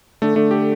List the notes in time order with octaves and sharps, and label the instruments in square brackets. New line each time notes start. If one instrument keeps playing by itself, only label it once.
[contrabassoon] D3 [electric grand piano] A3
[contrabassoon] D3 [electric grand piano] A3
[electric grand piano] G4